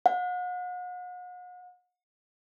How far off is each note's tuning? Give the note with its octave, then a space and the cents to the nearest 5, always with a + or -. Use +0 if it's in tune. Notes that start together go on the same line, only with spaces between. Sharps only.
F#5 -40